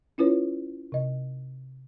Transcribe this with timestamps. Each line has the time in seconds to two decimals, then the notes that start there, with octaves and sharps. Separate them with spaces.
0.18 C#4 E4 F4 B4 C#5
0.92 C3 D#5